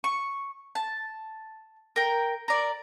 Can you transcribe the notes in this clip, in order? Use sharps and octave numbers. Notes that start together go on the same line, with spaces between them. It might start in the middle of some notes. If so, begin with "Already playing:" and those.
C#6
A5
A#4 G5
A#4 D5